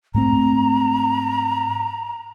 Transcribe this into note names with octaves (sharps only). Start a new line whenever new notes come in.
G#2 A3 C4 A#5